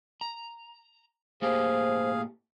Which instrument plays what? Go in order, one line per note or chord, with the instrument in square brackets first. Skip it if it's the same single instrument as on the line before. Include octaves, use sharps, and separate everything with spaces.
[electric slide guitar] A#5
[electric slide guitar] A2 A#3 G4 [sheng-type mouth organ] G#4 F5 [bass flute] C5